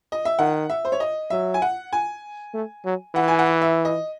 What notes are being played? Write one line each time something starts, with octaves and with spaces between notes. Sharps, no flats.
D#5
E5
D#3 F#5
E5
C5
C#5
D#5
F#3 E5
G#5
F#5
G#5
A3
F#3
E3 F#5
G#5
F#5
E5
D#5